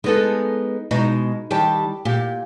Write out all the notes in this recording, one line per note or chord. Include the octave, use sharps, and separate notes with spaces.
G#3 B3 D#4 A4
B2 G#3 D#4
D#3 G3 G4 A5
A#2 G4